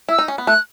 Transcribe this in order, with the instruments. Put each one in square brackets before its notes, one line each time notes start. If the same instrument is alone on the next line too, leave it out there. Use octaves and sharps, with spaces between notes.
[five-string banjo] E4 [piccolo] E6
[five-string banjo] D#4
C#4
B3
[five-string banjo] A3 [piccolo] F#6